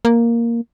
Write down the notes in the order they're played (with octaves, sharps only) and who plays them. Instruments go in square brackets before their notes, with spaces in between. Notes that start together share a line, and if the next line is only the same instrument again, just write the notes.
[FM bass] A#3